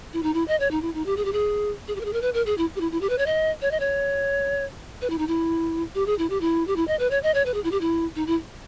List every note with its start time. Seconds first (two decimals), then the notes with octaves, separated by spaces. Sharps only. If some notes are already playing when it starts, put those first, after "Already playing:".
0.13 E4
0.23 D#4
0.34 E4
0.48 D#5
0.60 C#5
0.71 D#4
0.82 E4
0.94 D#4
1.06 G4
1.17 G#4
1.25 G4
1.33 G#4
1.88 G#4
1.96 G4
2.01 A#4
2.05 G#4
2.13 A#4
2.22 B4
2.34 A#4
2.46 G#4
2.58 E4
2.76 G4
2.81 E4
2.92 E4
3.01 G4
3.10 B4
3.18 C#5
3.26 D#5
3.62 C#5
3.71 D#5
3.80 C#5
5.02 B4
5.10 E4
5.18 D#4
5.28 E4
5.95 G4
6.06 G#4
6.19 E4
6.30 G4
6.41 E4
6.67 G4
6.76 E4
6.88 D#5
6.99 B4
7.11 C#5
7.23 D#5
7.34 C#5
7.46 B4
7.54 G#4
7.64 E4
7.72 G4
7.81 E4
8.16 D#4
8.27 E4